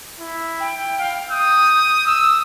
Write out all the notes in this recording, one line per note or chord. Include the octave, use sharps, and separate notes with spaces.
E4
G5
F5
D#6 G6
D#6 E6